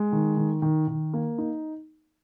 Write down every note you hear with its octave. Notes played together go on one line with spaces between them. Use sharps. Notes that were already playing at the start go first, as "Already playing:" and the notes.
Already playing: G#3
D#3
D#3
D#3
D#3
A#3
D#4